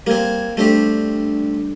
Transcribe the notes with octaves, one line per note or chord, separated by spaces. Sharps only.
G3 A#3 C4 G#6
G3 A3 C4 D4 G4